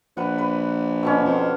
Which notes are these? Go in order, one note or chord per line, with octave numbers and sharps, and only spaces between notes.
A#1 B4 F#5
B4
B2 D3 C#4
F2